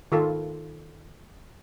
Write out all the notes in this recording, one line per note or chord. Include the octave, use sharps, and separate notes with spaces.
D#3 F4 A4